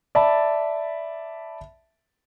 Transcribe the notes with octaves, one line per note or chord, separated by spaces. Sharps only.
D5 E5 A5 B5